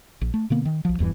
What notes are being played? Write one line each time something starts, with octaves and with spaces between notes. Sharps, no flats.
A#1
A3
B2 D3 A#3 B3
D#3
B1 F3
D#1 E2 G2 E3